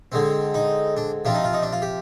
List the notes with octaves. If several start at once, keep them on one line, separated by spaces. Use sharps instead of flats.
D3 G#3 C4
D#4
D4
C3 F3 C4 D4
D#4
F4
D#4
D4
F4
G4